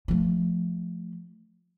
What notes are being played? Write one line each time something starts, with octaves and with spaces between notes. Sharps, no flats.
F3 A3